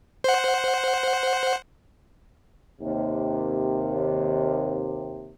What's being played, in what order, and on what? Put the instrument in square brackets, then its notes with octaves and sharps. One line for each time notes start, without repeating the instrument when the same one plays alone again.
[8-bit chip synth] C5 F#5
[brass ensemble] D#2 C3